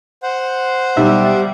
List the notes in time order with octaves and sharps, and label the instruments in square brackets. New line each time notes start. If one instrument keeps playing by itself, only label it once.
[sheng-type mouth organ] C5 F#5
[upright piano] B1 [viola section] G3 [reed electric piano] E5